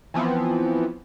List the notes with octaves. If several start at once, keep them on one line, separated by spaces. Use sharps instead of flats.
E3 F3 B3 C4